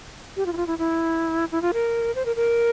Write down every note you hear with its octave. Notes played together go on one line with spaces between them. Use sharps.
G4
F4
E4
F4
E4
E4
E4
F4
A#4
C5
A#4
A#4